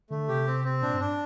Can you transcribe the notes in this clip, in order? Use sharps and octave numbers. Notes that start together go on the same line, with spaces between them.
D3 A3
C3 G4
C4
C4
A#2 D4
G2
D4